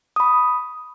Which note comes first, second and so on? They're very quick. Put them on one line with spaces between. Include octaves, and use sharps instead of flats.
D#6 B5 C#6